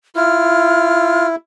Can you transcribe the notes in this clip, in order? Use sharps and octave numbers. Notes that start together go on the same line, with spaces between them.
E4 F4 F6